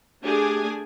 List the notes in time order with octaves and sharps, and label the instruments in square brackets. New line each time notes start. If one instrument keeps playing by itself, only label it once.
[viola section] A3 D4 G4 G#4 G#5